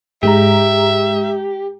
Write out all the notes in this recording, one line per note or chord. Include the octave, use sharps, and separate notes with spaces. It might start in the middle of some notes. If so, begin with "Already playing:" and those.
G#2 G#3 G4 E5 A#5